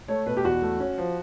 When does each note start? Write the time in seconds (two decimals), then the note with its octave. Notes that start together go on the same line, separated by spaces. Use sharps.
0.08 A3 C#5
0.26 B2 B4
0.37 G4
0.45 E2 F#4
0.62 A3
0.80 C#4
0.98 F3